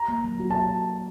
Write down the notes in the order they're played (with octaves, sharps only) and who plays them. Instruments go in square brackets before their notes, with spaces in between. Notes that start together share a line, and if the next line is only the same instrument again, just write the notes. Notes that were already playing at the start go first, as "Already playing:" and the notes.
Already playing: [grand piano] A#5
[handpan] A#3
F#3
F#4
[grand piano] A5